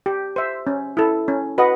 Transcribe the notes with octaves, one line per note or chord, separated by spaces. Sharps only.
G4
C5 E5
C#4
E4 A4
C#4
F#4 B4 D#5 F#5